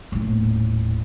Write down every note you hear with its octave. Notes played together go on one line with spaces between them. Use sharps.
D#1 A2